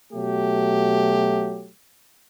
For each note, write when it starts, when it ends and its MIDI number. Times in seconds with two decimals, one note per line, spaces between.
0.13 1.69 47
0.13 1.69 54
0.13 1.69 57
0.13 1.69 67